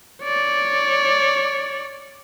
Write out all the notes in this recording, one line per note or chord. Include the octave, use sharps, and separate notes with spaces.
C#5 D5